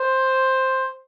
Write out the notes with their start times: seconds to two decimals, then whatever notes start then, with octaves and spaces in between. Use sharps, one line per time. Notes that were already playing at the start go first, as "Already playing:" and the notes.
Already playing: C5